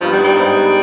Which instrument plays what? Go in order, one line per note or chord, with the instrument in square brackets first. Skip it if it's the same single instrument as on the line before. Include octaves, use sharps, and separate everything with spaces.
[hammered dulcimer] G2 D#3 B3 [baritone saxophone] F3
[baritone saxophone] G3
G3
[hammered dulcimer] G#2 D#3 B3